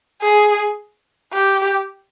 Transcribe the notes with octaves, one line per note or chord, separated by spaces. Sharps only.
G#4
G4